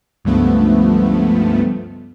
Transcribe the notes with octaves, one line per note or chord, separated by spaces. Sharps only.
C#2 G2 F3 A3 B3